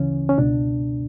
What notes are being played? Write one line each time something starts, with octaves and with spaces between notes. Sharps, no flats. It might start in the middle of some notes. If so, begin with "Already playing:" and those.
Already playing: D2 C#3 E3 C#4
C#4
C#2 B2 D4